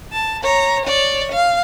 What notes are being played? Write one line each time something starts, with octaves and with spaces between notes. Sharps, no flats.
A5
C#5 A#5
C#5 D5
F5